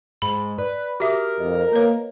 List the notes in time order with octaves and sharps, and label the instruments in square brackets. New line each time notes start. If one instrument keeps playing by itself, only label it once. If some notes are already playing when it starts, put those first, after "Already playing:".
[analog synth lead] G#2 [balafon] B5
[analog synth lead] B4 [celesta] D5
[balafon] F#4 E5 [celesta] G4 D6 D#6 [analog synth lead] A#4
[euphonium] F2 [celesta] D#5
[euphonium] A#3 [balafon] B4 C#5